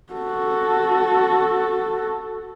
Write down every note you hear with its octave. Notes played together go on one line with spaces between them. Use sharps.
F#4 A4